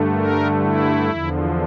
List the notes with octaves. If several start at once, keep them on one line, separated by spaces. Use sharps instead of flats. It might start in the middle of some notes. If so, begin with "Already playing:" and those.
Already playing: G2 D3 A3
A#4
E4
E2 D3 F3